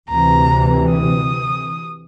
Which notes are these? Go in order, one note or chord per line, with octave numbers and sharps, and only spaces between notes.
D2 C3 E3 A#5
D#6